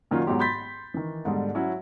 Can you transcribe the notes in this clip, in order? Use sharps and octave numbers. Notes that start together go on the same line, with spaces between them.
A#2 D#3 F#3 C#4 F4
G#2 B2 F#3 G4 C6
B5 C6 G6 A6 B6
D#3 E3
G#2 B2 D3 G3 G#3
F#3 C#4 E4 F#4